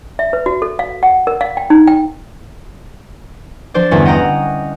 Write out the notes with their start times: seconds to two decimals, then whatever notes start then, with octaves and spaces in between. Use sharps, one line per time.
0.19 E5
0.33 B4
0.46 F#4
0.62 A4
0.79 F5
1.03 F#5
1.27 A#4
1.41 F5
1.57 G5
1.70 D#4
1.87 G5
3.74 F3 D4 C5 D5
3.91 G1 E2 C#4 E5
4.05 D#5 F#5 G5 A#5 D#6